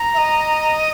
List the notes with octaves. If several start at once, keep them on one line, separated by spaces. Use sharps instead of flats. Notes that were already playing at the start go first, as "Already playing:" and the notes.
Already playing: A#5
E5
D#5